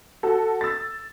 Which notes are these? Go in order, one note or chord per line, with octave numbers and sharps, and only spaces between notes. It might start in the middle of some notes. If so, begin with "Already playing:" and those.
F#4 A4
E6 A6